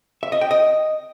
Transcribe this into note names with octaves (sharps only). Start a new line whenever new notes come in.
E5
D#5
G5
D#5